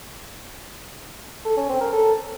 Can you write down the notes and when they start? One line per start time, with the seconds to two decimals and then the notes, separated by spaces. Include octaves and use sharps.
1.45 A4
1.57 C#4
1.69 C4
1.81 A#4
1.93 A4